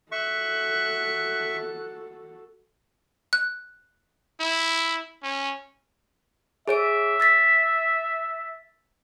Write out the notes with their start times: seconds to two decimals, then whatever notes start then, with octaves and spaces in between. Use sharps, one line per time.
0.12 F#4 A4 E5 C#6 F#6
3.33 F#6
4.40 E4
5.23 C#4
6.68 G#4 C#5 E5 D7
7.20 E6 A6 B6